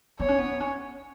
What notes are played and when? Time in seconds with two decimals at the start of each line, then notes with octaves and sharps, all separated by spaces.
0.20 B3 C#5
0.29 C#4
0.38 B3
0.60 C#4